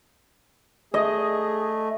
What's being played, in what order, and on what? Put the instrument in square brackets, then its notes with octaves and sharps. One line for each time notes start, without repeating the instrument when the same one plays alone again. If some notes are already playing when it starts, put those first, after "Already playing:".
[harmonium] A3 [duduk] G#4 [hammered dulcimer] D#5